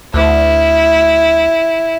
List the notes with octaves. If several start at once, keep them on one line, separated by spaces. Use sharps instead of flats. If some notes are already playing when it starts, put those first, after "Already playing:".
D2 E4